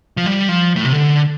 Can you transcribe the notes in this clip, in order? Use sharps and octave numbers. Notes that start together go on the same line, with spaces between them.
F3
G3
F3
A2
C3
D3